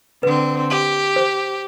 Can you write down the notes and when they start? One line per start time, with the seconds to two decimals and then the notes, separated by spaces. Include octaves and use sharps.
0.23 D3 C4 B4
0.70 G4
1.16 C5